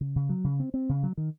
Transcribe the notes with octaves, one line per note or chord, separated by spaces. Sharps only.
C#3
C#3
F#3
C#3
C4
C4
C#3
F#3
D#3